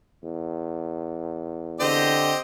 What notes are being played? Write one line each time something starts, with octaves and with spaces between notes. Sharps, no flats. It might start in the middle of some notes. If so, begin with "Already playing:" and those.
E2
D3 C4 G4 D#5